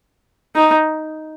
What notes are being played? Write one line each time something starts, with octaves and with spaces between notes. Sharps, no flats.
D#4